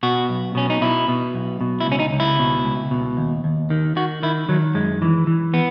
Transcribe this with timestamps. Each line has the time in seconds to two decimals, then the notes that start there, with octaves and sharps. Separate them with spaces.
0.03 B2 F#4
0.30 B1
0.55 B2 C#4
0.70 D#4
0.81 B2 E4
1.08 B2
1.34 B1
1.61 B2
1.80 E4
1.86 C#2
1.92 C#4
1.99 D#4
2.13 C#2
2.20 E4
2.40 B2
2.65 C#2
2.91 B2
3.17 D#2
3.44 D#2
3.70 D#3
3.96 D#3 F#4
4.23 D#3 E4
4.49 D#3 F#3
4.74 F#2 G#3
5.02 E3
5.27 E3
5.54 B3